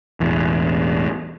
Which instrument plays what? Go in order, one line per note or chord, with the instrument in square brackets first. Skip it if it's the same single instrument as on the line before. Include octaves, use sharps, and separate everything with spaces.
[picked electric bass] E1 A1 E2